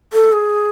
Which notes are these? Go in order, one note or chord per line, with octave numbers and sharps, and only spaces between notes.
A4
G#4